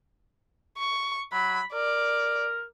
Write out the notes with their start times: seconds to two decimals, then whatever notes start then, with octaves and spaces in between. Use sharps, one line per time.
0.78 C#6
1.32 F#3 B5
1.73 A#4 D5